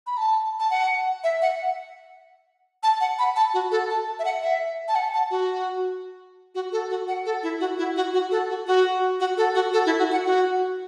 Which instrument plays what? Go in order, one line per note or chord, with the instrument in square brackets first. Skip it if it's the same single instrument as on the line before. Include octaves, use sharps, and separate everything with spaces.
[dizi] B5
A5
A5
F#5
E5
F#5
A5
F#5
B5
A5
F#4
A4
A5
E5
F#5
E5
A5
F#5
A5
F#4
F#4
A4
F#4
F#5
A4
E4
F#4
E4
F#4
F#4
A4
F#4
F#4
F#4
A4
F#4
A4
E4
F#4
F#5
F#4